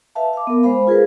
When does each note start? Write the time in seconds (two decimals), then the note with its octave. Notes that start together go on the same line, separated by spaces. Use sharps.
0.15 B4 E5 F5 A5
0.33 F5 D6
0.47 B3 A#4
0.63 G#3 C5 F5 B5
0.87 F4 G#4 A#4 B4